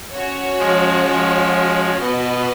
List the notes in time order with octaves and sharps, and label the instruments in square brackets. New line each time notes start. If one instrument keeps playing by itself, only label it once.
[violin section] C#4 F#4 C#5
[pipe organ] F3 G#3
F3 G#3
[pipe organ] B2 [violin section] B3 F#4 B4 D#5